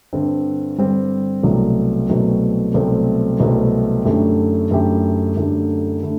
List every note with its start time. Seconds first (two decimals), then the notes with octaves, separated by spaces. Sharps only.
0.13 G2 D3 G3 C4
0.78 G2 D3 G3 C4
1.43 C2 B2 F#3 A3 C4
2.09 C2 B2 F#3 A3 C4
2.74 C2 B2 F#3 A3 C4
3.40 C2 B2 F#3 A3 C4
4.05 F#2 D3 A3 E4 G4
4.71 F#2 D3 A3 E4 G4
5.36 F#2 D3 A3 E4 G4
6.03 D3 A3 E4